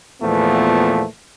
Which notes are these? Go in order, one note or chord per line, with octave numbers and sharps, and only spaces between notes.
E2 A#2 F3 A3 B3